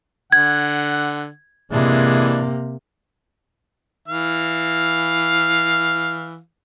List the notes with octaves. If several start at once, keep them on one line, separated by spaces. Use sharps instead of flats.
D3 F#5 G#6
C3 E3 G#3 A#3 D4
E3 F5